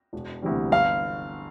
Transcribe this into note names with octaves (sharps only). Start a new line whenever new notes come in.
E1
D2 C3 E3 G3
G1 F5